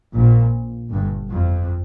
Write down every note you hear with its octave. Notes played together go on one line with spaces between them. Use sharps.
A#1 A#2
G1 G2
F2